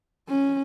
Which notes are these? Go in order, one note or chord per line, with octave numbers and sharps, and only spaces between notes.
C#4